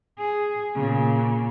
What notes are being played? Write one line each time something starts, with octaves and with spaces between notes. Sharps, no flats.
G#4
A#2 C#3